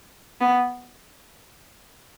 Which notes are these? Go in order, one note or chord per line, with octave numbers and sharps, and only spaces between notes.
B3